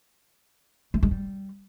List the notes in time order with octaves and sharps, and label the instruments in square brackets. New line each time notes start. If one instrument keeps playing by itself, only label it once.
[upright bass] A3
G#3
G3